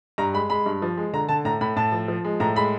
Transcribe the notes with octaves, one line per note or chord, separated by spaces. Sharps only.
G2 A#5
G#3 B5
G#3 B5
G2
F3
G#3
D3 A#5
D3 A5
A2 A#5
A2 B5
A2 A5
F3
F3
G#3
A2 A#5
G#3 B5